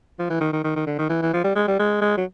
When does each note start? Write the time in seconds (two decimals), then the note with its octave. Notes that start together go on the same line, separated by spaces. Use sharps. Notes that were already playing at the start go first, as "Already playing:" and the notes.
0.19 F3
0.30 E3
0.41 D#3
0.53 D#3
0.64 D#3
0.76 D#3
0.86 D3
0.99 D#3
1.09 E3
1.22 E3
1.33 F3
1.44 G3
1.56 G#3
1.68 G3
1.79 G#3
2.01 G#3
2.17 F#3